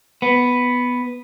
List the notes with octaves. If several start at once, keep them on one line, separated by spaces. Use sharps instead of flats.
B3